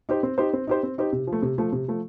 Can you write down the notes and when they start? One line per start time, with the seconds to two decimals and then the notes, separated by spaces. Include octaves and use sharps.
0.09 D#4 G4 C5
0.23 C4
0.38 D#4 G4 C5
0.53 C4
0.67 D#4 G4 C5
0.83 C4
0.98 D#4 G4 C5
1.12 C3
1.27 F3
1.33 A3
1.42 C3
1.58 F3 A3
1.72 C3
1.88 F3 A3